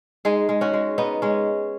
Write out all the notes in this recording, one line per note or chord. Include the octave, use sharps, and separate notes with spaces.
G#3 D#4 G#4
G#3
C#4 F#4
G#3
B3 D#4
G#3 C#4